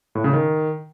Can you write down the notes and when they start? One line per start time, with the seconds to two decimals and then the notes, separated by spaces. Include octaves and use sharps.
0.15 A2
0.24 C#3
0.33 D#3